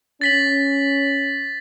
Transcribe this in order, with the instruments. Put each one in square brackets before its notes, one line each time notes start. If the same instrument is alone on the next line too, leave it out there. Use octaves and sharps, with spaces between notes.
[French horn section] C#4 [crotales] A6 B6 F#7